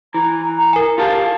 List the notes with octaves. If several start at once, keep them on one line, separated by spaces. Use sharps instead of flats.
E3 A#5
A#4 G#5
F4 G4 F5 A5